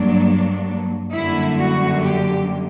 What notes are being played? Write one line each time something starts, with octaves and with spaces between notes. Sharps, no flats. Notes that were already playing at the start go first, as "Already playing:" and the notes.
Already playing: G2 F#3 A#3 D4
F#2 D3 G3 A#3 E4
F#4
G4